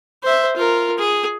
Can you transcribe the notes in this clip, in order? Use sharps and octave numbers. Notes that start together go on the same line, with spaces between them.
C5 E5
F4 A#4
G#4